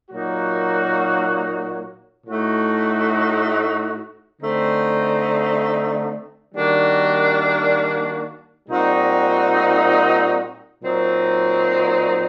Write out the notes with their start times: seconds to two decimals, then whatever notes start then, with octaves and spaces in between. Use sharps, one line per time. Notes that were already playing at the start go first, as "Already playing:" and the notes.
0.11 A#2 F#3 A#3 D#4 F#4
2.25 A2 A3 D#4 F#4
4.39 D3 A3 C4 D#4
6.53 D#3 G3 A#3 D4 F#4
8.68 A#2 G3 C4 D#4 F#4
10.81 A#2 F#3 C4 D#4